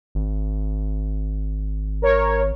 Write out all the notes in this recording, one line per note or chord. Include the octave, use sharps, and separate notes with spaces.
G#1
A#4 C#5